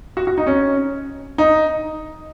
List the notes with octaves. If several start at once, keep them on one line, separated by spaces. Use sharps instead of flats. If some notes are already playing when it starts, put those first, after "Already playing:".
F#4
F#4
D#4
C#4
D#4